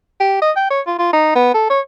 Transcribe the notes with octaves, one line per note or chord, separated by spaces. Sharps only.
G4
D#5
G5
C#5
F4
F4
D#4
B3
A4
C#5